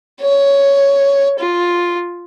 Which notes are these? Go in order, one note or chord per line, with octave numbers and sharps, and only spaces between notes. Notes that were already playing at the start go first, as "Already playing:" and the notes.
C#5
F4